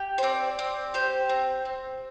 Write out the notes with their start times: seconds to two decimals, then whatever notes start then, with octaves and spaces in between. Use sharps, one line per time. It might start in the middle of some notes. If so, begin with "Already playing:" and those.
Already playing: G4
0.18 C5
0.23 C4 D5
0.59 C4
0.94 G4 C5
1.29 C4
1.65 C4